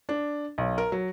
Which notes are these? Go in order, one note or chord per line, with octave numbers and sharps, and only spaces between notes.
D4
B1
A#4
F#3